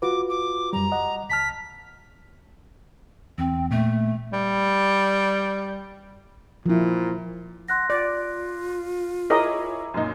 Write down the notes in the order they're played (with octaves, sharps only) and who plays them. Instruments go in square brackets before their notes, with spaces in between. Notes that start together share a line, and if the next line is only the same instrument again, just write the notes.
[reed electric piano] F4 F#4 B4 [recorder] D6
[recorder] D6
[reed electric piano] F#2 G3 [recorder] A#5
[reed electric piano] D#5 F#5
[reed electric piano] C#2 A5 F6 [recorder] B6
[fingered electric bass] E2 [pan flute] C4
[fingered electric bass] A#2 [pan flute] A3
[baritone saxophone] G3
[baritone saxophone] A#2 [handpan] F3 E4
[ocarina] F#5 [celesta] C6 F#6 A#6
[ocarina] F4 [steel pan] D5
[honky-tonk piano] E4 G#4 C#5 [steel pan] A#4 D#5 [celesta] A#5 D6
[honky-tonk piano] F#2 A#2 D#4